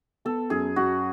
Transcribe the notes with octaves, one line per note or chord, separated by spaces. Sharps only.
B3 A4
F#2 G#4
F#2 F#4